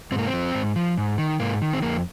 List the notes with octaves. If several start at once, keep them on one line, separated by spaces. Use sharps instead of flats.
G#2 C4
A#3
C4
F3
G#2
F3
G#2
D#3
G#2 A#3
D#3
C4
F2 A#3